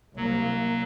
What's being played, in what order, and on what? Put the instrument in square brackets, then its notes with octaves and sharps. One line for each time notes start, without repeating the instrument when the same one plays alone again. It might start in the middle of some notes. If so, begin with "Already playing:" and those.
[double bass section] C2 A#3 [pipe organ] F#3